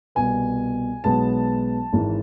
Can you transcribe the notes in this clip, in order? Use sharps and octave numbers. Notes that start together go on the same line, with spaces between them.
C2 B2 B3 G#5
B1 B2 G#3 B3 A5
G#1 G#2 E3 G#3